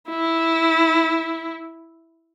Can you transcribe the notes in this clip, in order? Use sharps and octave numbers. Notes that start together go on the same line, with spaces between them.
E4